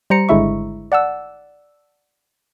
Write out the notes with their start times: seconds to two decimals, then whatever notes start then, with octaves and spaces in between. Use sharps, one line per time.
0.10 G3 C5 A#5 C#7
0.29 G#1 D3 G#3 E4 E5 C#6
0.92 D5 F#5 A5 E6